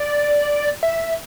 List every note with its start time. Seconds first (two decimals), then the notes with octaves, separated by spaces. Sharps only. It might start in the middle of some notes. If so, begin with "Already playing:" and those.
Already playing: D5
0.83 E5